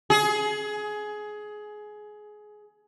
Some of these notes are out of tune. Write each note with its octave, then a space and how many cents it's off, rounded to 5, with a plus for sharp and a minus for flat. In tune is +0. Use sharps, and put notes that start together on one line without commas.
G#4 +20